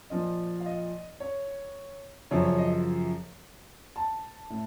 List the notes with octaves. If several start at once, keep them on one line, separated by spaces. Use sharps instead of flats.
A#2 F3 D#5
F5
D#5
C#5
F#2 C#3 F3 C#5
C#5
D#5
A5
A2